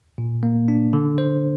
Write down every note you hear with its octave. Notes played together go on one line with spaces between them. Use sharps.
A#2
A#3
D4
D3
C5